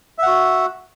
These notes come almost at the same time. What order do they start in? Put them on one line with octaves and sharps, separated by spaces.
E5 F#5 F#4